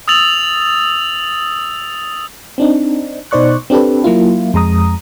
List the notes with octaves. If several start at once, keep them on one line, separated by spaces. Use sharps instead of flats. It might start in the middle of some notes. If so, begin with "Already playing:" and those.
D#6 E6 A6 F7 F#7
C4 D4 D#4
B2 D#4 C5 D5 C#6 F#6
C4 D4 G4 A4 B4
F#3 A#3 E4 F4
F2 G#3 A#5 D#6